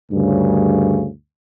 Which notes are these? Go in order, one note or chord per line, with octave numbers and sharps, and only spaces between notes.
D2 G2 C#3